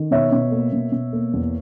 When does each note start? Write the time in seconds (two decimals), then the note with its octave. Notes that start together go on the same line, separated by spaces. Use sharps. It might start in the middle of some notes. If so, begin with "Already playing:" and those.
Already playing: D#3
0.11 B2 C#5 E5
0.32 B2
0.52 A#3
0.72 B2
0.92 B2
1.13 A#3
1.33 E2